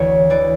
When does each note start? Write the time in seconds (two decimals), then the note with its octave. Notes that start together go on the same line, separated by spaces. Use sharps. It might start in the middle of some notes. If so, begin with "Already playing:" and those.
Already playing: D2 E3 C#5
0.30 E3 D5